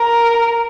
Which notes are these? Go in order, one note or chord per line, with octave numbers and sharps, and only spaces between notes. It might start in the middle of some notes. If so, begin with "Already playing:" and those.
Already playing: A#4